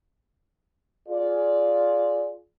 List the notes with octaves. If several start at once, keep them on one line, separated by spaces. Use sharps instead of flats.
F4 G#4 D5